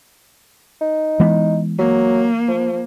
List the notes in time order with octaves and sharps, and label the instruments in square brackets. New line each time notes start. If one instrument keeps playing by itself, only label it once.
[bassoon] D#4
[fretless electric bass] E3 G#3 B3
[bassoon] F#3 [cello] A#3
[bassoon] F3